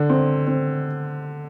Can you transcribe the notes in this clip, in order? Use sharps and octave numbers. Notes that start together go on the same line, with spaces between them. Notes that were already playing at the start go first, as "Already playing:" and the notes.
Already playing: D3
C4
C4